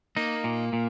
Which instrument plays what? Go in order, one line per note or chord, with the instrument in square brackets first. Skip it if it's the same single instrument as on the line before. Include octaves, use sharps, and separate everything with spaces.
[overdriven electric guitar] A#3 [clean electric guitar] D#4
[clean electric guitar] A#2
A#2